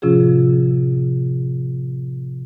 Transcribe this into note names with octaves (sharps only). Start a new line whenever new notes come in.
A2 C3 F3 C#4 F4 G#4